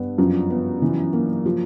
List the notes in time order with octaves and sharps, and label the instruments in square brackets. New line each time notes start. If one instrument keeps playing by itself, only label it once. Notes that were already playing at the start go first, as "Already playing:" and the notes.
Already playing: [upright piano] G2 [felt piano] B3
[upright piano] F#2 [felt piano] F3
[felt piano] B3
E3
A#3
F3